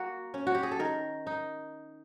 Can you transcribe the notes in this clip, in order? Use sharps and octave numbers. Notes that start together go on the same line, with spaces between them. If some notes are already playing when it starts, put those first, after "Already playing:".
Already playing: A#3 F#4
C#4
F#4
G4
G#4
A4
D#3 A#4
D#4